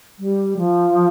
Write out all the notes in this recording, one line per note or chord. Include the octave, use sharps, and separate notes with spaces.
G3
F3